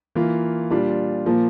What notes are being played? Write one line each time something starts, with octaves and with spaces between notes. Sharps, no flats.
E3 A#3 F4
A#2 G3 D4 F4
A#2 F3 A#3